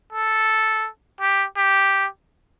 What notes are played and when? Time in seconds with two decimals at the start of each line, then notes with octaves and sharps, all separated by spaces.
0.12 A4
1.21 G4
1.57 G4